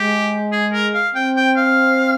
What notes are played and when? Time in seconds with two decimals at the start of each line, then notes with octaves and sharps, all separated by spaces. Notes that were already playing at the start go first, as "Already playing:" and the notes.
Already playing: G#3 G4
0.52 G#4
0.73 A#4
0.94 F5
1.15 C4 G5
1.37 G5
1.57 F5